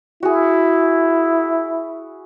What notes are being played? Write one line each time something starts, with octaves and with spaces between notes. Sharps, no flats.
E4 F#4 G#4